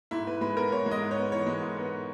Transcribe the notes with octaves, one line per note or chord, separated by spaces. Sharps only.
G#2 E4
G#2 B4
G#3 B4
B3 A#4
G#2 C#5
G#3
D#5
G#2
C#5
B3
E3 C#5
G#3
G#2
B3